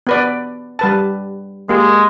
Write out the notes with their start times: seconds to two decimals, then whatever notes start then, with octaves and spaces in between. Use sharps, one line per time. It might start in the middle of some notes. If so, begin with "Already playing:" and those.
0.07 B3 B4 D5
0.79 G3 B4 A5
1.69 G#3 A#3 G4